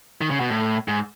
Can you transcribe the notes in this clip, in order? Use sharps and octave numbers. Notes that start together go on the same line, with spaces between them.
D#3
C#3
B2
A2
G#2